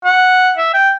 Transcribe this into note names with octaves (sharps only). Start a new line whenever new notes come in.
F#5
E5
G5